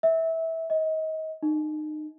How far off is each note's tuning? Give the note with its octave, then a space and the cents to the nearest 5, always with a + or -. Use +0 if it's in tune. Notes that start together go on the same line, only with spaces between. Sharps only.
E5 -20
D#5 +30
D#4 -30